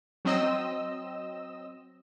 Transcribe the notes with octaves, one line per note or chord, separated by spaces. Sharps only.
F#3 C4 D#5 E6